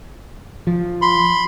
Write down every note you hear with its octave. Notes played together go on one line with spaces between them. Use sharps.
F3
B5 C6